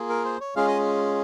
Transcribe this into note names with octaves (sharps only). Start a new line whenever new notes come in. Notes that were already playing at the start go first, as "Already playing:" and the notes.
Already playing: A#3 F4 G#4
A#4
C5
C#5
G#3 C#4 F4 G#4 F5
D#5